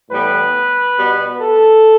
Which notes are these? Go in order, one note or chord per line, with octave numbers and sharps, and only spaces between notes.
A2 E3 G3 B3 B4
B2 G3 B3
A4